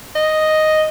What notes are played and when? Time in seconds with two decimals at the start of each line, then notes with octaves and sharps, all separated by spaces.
0.15 D#5